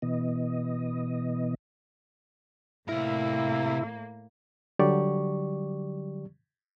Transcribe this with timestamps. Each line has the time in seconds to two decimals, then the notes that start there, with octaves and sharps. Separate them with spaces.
0.02 B2 E3 B3 D#5
2.89 A2 C3 A#3 E4 A#4
4.79 D3 F#3 G3 G4 D5 C#6